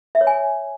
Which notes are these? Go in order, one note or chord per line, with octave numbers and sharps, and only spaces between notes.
E5
C#5
G#5